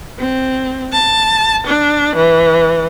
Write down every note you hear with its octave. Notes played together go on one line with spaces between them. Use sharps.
C4
A5
D4
E3